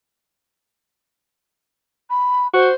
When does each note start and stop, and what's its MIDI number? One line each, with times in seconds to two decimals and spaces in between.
2.09 2.47 83
2.53 2.70 66
2.53 2.74 72